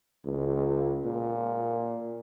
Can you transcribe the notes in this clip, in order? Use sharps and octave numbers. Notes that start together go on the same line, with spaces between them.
C#2
A#2